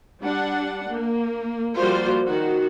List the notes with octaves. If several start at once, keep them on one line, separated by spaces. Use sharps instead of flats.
G3 D4 F#5
A#3
F3 G3 A#3 F4 F#4 C5
D#3 F#4